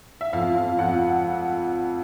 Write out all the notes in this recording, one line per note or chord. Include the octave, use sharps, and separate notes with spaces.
E5
F2 F5
F2
F2 F#5